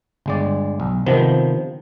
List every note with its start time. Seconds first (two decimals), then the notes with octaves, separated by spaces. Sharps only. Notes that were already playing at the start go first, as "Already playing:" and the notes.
0.26 G1 G#3 D5
0.80 B1
1.06 C3 D#3 F3 B3